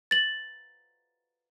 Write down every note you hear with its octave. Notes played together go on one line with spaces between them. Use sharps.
A6 F#7